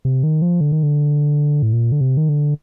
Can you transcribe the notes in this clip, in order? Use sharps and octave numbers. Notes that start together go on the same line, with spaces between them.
C3
D#3
F3
D3
D#3
D3
A2
A#2
D3
C3
D#3
D3